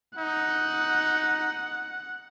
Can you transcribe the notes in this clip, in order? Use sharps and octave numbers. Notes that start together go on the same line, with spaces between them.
D#4 F#5